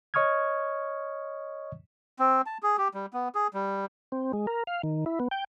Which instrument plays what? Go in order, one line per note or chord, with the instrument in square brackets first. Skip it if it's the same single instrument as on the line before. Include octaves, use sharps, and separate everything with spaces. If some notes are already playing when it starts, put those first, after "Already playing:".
[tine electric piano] C#5 D#5 C#6 D#6 F6 G#6
[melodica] C4
A5
G#4
G4
G3
B3
G#4
G3
[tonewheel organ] C4
G#3
A#4
F5
D#3
E4
B3
G5